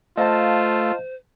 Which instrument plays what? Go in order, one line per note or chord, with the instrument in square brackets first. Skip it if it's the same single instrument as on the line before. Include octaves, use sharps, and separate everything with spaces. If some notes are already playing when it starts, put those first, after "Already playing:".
[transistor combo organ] A3 [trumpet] F4 [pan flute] C5 [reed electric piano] D#5 F5 A5